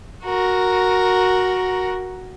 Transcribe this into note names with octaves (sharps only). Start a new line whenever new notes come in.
F#4 A#4